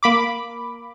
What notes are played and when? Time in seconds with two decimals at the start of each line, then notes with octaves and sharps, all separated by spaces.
0.03 A#3 B5 D6